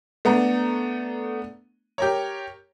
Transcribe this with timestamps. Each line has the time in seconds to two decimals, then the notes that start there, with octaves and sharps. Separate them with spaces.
0.25 A3 B3 D4 A#5
1.98 G4 A#4 C#5